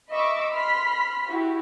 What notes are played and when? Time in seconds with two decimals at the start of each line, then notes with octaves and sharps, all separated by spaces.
0.11 D#5 E5 B5 C#6 D6 E6
0.52 B5 C6 F6 B6
1.30 E4 F#4 G4